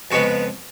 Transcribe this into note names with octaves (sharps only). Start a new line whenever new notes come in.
F2 C#3 G#3 B3 F#4